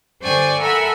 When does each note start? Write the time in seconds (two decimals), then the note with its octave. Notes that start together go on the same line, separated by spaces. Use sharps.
0.22 G2 D3 C5 D5 G#5 C#6
0.60 A4 A#4 E5 F#5 G#5 B5